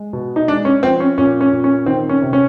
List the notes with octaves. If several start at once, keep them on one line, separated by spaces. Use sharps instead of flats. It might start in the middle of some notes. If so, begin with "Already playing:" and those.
Already playing: G#3
B2
D#4
G#3 D4
C#4
F3 C4
C#4
A#2 C#4
C#4
A#2
C#4
D#3 C4
C#4
C3
C#4